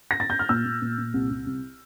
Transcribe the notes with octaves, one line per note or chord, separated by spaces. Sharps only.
A#6
A6
G6
F6
A#2 E6
A#2
A#2
A#2
C2
C2
C2